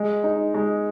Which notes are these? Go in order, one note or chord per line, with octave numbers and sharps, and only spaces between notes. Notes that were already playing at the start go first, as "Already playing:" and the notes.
Already playing: G#3
D#4
G#3